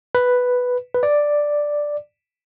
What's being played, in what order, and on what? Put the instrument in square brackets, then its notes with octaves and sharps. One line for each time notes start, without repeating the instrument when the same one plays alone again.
[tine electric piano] B4
B4
D5